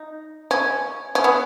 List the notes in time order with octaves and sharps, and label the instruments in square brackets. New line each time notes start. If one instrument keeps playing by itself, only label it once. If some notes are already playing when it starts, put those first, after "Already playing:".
Already playing: [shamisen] D#4
C#4
C#4
B3